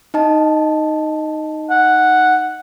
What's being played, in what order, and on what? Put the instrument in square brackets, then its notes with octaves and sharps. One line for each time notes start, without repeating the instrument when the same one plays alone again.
[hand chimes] D#4 D#5 A5
[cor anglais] F#5